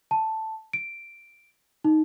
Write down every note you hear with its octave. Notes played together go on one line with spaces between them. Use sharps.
A5
D7
D#4